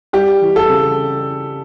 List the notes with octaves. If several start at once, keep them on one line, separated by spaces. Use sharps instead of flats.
G3 G4
E3
A4
C#3